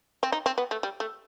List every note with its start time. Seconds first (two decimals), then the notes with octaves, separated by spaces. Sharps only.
0.23 C4
0.32 D#4
0.46 C4
0.58 B3
0.71 A3
0.83 G3
1.00 A3